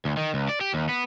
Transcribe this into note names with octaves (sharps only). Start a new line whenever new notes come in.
D2
D#3
C#2
D5
G4
D#2
B3